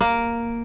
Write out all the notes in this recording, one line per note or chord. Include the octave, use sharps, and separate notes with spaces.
A#3